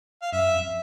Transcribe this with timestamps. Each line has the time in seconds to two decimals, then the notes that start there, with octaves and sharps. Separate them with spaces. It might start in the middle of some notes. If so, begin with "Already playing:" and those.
0.22 F5
0.32 F#2 E5
0.54 F2